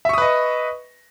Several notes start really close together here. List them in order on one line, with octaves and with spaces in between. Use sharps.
E5 C#6 D#6 B4 D#5